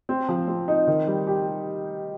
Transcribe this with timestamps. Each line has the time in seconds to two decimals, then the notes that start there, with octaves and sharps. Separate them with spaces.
0.09 C4
0.29 F3
0.48 C4
0.68 D#4
0.87 D#3
1.07 G3
1.27 G4